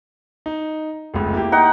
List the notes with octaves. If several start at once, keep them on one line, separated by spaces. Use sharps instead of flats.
D#4
F1 C#2
A#3 E4 G4
D#4 F#5 G5